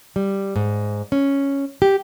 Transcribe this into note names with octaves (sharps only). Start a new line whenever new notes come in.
G3
G#2
C#4
G4